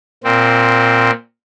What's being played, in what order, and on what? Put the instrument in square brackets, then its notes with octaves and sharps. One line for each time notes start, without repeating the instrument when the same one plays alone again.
[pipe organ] A#2 C4